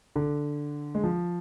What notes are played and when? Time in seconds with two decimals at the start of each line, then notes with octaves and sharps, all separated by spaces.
0.16 D3
0.95 G#3
1.04 F3